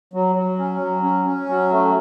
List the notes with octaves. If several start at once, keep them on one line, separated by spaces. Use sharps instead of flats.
F#3
F#3
C#4
F#3
C#4
C#4
F#3
A3